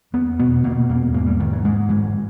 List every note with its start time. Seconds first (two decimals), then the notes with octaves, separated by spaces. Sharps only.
0.13 E2 B3
0.40 B2 B3
0.64 B2 A#3
0.89 E2 A#3
1.14 G#2 A#3
1.26 G3
1.39 G#2 D#3
1.52 E3
1.64 G#2 G#3
1.89 G#2 E3